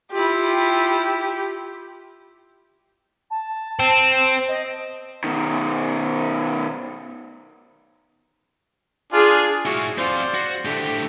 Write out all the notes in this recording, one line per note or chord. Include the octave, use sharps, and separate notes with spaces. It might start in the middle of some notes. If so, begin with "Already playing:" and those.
E4 F4 G4
A5
C4
D#5
B2 D#3
D4 F4 G#4
E4 F#4 G#4 C#5
C4 C5 D5 F5
F#4
A2 D3 A3 G4